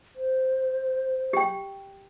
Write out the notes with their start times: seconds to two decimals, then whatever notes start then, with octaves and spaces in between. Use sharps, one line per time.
0.16 C5
1.33 G4 G5